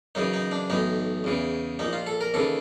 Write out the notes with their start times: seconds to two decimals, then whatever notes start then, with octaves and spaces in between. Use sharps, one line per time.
0.15 F#2 C#3 E3 D#4
0.33 D#4
0.51 D4
0.70 B1 A2 E3 D#4
1.24 E2 C#3 E3
1.79 A#1 A#2 D#4
1.93 F4
2.06 A4
2.21 A#4
2.34 D#2 C#3 E3 A4